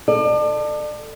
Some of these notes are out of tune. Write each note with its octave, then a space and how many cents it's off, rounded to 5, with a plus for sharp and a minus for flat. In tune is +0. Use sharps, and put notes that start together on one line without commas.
A4 +15 D5 +35